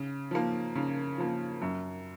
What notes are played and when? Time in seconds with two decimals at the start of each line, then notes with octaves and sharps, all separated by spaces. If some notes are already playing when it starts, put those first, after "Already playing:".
Already playing: C#3
0.31 F3 A#3
0.75 C#3
1.18 F3 A#3
1.62 F#2